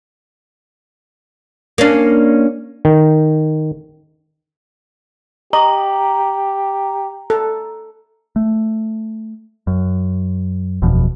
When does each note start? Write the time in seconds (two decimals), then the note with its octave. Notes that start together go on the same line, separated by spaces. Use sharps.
1.78 A#3 C#4 D4
2.85 D#3
5.53 G4 D#5 A#5
7.30 A4
8.36 A3
9.67 F#2
10.82 F#1 E2 B2 F3